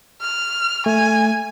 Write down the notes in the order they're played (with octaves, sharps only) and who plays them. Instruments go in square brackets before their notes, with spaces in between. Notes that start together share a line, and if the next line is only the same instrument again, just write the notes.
[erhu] F6
[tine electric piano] A3 [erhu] G#5